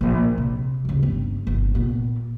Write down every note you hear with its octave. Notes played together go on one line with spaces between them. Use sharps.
A#1 F3
C3
D2 C#3
G1
G1 C3
A#2 B3